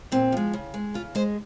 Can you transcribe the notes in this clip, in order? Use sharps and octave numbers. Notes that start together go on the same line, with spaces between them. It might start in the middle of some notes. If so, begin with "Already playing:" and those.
A#2 C4
F3 G#3
C#3
G#3
C#3 F4
G#3 C5